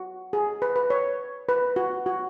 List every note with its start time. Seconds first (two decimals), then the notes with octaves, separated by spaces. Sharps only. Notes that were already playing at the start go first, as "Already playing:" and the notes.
Already playing: F#4
0.33 G#4
0.62 B4
0.76 B4
0.90 C#5
1.49 B4
1.76 F#4
2.06 F#4